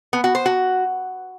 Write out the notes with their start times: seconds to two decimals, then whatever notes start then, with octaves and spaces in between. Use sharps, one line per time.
0.13 B3
0.24 F#4
0.35 C5
0.46 F#4